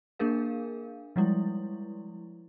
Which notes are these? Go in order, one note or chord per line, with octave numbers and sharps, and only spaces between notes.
A#3 D4 G#4 A#4 F5
F3 G3 G#3 E4